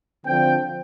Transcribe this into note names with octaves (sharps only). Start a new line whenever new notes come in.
D3 F3 C4 G5